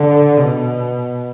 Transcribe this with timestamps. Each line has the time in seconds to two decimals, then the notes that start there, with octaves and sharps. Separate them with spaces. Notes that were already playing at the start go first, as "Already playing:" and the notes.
Already playing: D3
0.39 B2